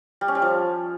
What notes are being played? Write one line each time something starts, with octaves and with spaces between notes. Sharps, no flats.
G3
C#4
G3
F3